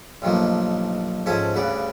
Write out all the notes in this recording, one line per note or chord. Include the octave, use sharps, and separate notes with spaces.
B1 G2 D#3 F3 A3 A#3
G#2 F3 C#4 A4 E5 G#5
D2 G2 C#3 B4 D5